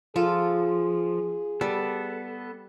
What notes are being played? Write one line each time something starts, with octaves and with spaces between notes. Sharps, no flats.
F3 F4 G#4 A4
G3 B3 A4